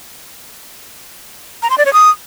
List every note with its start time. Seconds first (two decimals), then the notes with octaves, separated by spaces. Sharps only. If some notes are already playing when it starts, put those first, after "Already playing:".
1.63 A#5
1.70 C6
1.78 D5
1.85 C#5
1.93 D#6